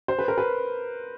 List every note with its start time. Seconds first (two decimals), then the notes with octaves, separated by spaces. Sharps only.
0.08 C5
0.19 B4
0.28 A#4
0.38 B4